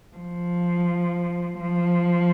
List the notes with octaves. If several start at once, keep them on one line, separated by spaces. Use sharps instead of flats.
F3
F3